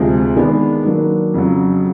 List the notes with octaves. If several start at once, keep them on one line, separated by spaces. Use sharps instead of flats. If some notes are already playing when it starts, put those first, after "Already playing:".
Already playing: D2 C3 F3 G#3
D#3 G#3 B3 D4
D#3 F#3 A#3 D4
F2 C#3 F#3